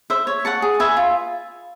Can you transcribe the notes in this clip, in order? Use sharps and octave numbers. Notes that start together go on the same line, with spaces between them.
C5 E5
C#5
F#5 A5 C#6
G#4
B4 E5 G#5
F4